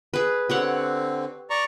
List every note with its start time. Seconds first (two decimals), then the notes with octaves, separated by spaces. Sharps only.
0.14 G#4 B4
0.50 D3 C4 G4 C#5 F#5
1.50 D5 A#5 C#6